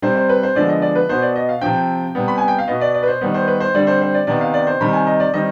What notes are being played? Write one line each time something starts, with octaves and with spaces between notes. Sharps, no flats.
C3 G3 C4 C5
C5
B4
C5
D3 F3 G#3 B3 D5
D#5
D5
B4
B2 B3 C5
D5
D#5
F5
C3 F3 C4 G5
C3 G3 B3
B5
G#5
G5
F5
B2 B3 D#5
D5
D5
B4
C5
D#3 G3 B3 B4
C5
B4
C5
D3 G3 C4 D5
C5
C5
D5
C3 D#3 B3 D5
F5
D5
C5
C3 D#3 G3 C4 B5
G#5
D#5
D5
D#3 G3 C4 D#5